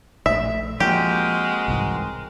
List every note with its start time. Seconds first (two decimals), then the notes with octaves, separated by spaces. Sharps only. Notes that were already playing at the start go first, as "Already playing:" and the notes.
0.26 A#1 A3 E5
0.80 F3 G#3 A#3 C4 F#4 G4 A#4
1.68 C2 G#2 E3